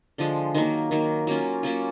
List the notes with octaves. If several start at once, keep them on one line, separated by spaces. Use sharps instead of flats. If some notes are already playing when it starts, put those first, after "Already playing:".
D3 F3 G#3
D#3 F#3 A#3
D#3 F#3 A#3
F#3 A#3 C#4 F4
F#3 A#3 C#4 F4